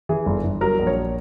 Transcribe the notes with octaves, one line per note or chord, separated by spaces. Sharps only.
E3 G#4
G1
G1
F#3 A#4
A#1
C#5